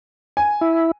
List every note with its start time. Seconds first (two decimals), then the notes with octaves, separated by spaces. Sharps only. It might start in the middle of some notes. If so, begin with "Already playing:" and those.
0.37 G#5
0.61 E4